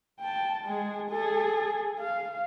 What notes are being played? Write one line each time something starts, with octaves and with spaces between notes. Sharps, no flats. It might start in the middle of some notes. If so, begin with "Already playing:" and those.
G5 A5
G#3 G#4
G#4 A4
F5